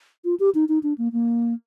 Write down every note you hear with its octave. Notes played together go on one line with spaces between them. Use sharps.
F4
G4
D#4
D#4
D4
A#3
A#3